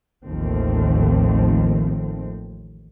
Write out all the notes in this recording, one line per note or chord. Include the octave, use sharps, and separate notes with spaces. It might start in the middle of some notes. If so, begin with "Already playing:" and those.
A1 D#2 D#3 F3 A3 C4